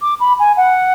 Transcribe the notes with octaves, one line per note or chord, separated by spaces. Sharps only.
D6
B5
G#5
F#5